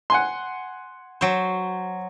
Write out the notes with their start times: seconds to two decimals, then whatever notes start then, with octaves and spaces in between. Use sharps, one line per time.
0.10 F#5 G#5 C6
1.21 F#3 C5